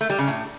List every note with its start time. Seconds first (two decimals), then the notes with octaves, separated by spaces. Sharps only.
0.01 A3
0.10 G3
0.19 C#3
0.27 A2